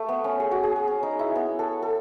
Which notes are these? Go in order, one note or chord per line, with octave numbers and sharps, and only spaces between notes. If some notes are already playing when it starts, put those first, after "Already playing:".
Already playing: A3
B3
C#4
G#4
F#4
G#4
G#4
C#4
D#4
E4
B3
A4
A4